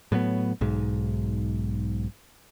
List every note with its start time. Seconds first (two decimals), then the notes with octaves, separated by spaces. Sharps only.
0.12 A2 F#3 G3 B3
0.61 B1 G#2